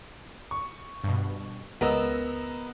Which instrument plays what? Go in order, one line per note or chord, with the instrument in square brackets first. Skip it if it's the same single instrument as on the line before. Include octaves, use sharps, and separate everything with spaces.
[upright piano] C#6
[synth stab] G2 B2
[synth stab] C#2 E6 [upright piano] B3 A#4 D#5